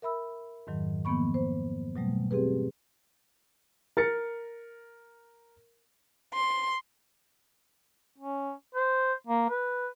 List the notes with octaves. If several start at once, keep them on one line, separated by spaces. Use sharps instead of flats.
A#4 E5 B5 E6
F2 G#2 D#3 F#3
D#3 F3 A#3 B3 B5 C#6
C5
B2 F#3 G3 A3
C4 G4 G#4 B4
A#4 A6 C#7
C6
C#4
C5
A#3
B4